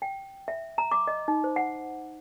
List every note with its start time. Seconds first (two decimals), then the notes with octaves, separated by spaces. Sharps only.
0.02 G5
0.48 E5
0.78 A#5
0.92 D6
1.08 D#5
1.28 D#4
1.44 C5
1.56 F#5